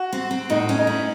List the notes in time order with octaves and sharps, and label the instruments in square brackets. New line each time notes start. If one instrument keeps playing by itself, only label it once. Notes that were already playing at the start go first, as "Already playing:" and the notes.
Already playing: [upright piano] F#4
[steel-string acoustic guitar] C4
C4
[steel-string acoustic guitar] A2 [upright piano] D#4
[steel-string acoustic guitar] C#4
[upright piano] D#4
[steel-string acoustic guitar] E4